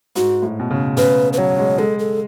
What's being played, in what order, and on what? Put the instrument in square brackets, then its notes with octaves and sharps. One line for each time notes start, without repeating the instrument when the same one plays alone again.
[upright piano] G#2 [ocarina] F#4
[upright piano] A2
B2
C#3
[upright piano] C#3 [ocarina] B4
[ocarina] B4
[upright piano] F#3 [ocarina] C#5
[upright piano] G#3
[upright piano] G#3 [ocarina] A4
[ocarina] A4